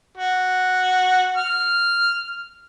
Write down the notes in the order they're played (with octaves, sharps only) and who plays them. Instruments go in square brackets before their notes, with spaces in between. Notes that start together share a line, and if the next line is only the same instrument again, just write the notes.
[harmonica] F#4
F6